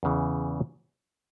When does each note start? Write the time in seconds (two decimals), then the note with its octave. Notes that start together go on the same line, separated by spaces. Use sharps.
0.03 E2 C#3 E3